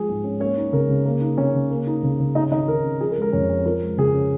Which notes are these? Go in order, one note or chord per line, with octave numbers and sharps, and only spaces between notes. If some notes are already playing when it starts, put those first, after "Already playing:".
Already playing: F3 G#3 G#4 G#5
G#2
C#4
A#3 C#4 C#5
D#4
C#3 A#4
C#3
A#3
D#4
C#3 C#4 C#5
C#3
A#3
D#4
C#3
C#3
C#4 D#4 D#5
D#3 D#4 D#5
D#3 A#4
C#4
F3 G#4
A#4
G#3
A#4
F2 C#4 C#5
C#4
F3 A#4
G#3
C#3 G#4
C#4